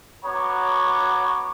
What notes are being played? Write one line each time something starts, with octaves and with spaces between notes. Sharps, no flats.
B3 F#4 C#5 A#5 D6